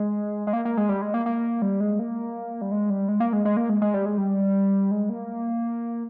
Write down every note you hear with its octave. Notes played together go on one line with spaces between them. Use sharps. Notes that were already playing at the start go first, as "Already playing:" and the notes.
Already playing: G#3
G#3
A#3
A#3
G#3
G3
G#3
A#3
A#3
G3
G#3
A#3
G3
G#3
G3
G#3
A#3
G#3
G#3
A#3
G#3
G#3
G3
G#3
G3
G#3
A#3